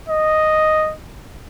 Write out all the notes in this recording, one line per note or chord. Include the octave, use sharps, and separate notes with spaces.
D#5